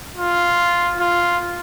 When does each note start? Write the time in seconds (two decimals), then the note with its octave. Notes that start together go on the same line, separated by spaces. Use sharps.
0.17 F4
1.00 F4